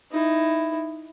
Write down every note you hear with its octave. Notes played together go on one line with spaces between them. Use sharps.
D#4 E4